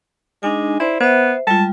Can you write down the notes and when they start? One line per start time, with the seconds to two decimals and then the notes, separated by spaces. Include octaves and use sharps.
0.43 G#3 D4 D#4 G#5
0.80 E4 C5 D5 C6
1.00 B3 C5 E5
1.47 G3 G#3 F4 A5